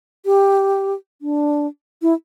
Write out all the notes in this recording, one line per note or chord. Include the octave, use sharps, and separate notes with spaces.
G4
D4
E4